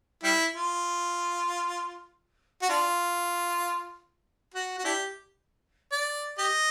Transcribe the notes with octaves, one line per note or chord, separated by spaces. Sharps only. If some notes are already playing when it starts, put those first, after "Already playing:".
G3 E4
F4
F#4
D4 F4
F#4
F#4
D4 E4 G4
D5
G4 D#5